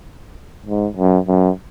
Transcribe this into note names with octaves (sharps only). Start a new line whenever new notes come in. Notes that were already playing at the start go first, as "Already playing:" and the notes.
G#2
F#2
F#2